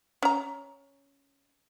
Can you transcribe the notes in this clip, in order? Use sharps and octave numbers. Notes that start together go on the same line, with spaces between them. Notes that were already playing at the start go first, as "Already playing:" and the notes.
C#4 A#5